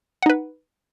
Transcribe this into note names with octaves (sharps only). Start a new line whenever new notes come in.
D#4 B4 F#5